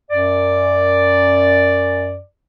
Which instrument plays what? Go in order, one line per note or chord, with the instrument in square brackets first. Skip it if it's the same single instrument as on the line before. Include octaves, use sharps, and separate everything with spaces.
[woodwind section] F#2 D5